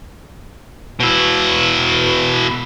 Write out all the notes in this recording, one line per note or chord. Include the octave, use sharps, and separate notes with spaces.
B2 E4